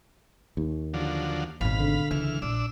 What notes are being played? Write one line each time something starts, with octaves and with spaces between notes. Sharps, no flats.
D#2
D3 F3 F#3
G#1 B2 F5 B5
D3
C#2 E3 F6
A#1 D4 E6